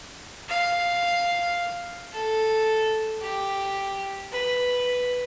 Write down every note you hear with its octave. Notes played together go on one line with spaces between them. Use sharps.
F5
A4
G4
B4